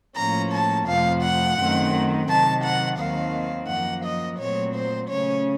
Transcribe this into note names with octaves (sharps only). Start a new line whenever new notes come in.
A2 F3 A#3 C#4 A#5
A5
F2 C3 F3 A3 F5
F#5
F#2 D#3 A3 C4
C3 D#3 F#3 A5
F#5
D#2 D#3 F#3 C4 F5
F#2 F3 A#3 F#5
D#5
A#2 F#3 A3 C4 C#5
C5
C#3 A3 C#4 C#5